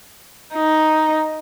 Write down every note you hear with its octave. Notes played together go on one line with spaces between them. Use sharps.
D#4